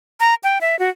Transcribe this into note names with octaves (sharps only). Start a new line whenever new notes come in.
A#5
G5
E5
F#4